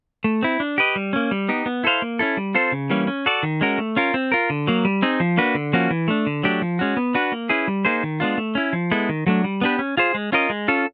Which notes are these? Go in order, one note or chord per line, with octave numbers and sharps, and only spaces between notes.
A3
C4 E4
D4
G4 B4 D#5
G3
A#3 C#4
G3
B3 D#4 G4
B3
E4 A4 C5 F5
A#3
C#4 E4 A4
G3
C4 F4 A4 C5
C#3
E3 G3 A#3 C#4
C#4
F#4 A4 D5
D#3
G#3 C#4 F#4 A#4
A3
C#4 F4 A#4
C4
F4 A#4
D3
F#3 A#3
G3
C4 D#4 G#4
F3
A#3 D4 F#4 B4
D3
F3 A#3 C#4 F#4
E3
A3 D4
D3
F#3 A3 D4 G4
F3
G#3 C#4 F#4
B3
D4 F#4 B4
A#3
C#4 E4 G#4 B4
G3
A#3 D#4 G#4 C5
D#3
G#3 B3 D4 F4
A3
C#4 E4
F3
G#3 B3 E4 A4
D#3
F#3 A3 D4
G3
B3 D4 G4 B4
C#4
F4 G#4 C5
G#3
C#4 F4 A#4 D#5
G#3
C#4 F4 A4